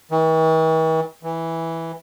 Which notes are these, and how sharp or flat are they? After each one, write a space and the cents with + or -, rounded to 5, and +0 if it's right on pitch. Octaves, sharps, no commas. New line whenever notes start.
E3 -45
E3 -5